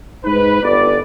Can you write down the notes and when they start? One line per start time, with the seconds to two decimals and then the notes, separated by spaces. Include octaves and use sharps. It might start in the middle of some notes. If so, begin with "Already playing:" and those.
0.24 G#2 D#4 B4
0.62 G1 D5